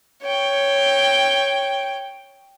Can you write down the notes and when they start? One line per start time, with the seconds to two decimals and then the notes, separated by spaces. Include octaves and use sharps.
0.23 C#5 G5